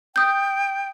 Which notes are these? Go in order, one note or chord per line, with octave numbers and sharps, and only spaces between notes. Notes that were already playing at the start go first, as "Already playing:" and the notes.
G5 D#6 G6